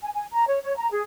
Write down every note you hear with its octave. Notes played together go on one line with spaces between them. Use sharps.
G#5
G#5
A#5
C#5
C#5
A#5
G#4